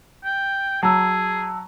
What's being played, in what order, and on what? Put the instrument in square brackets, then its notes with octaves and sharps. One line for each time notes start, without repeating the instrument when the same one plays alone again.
[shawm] G5
[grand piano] F#3 [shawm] G#4 [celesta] A5 E6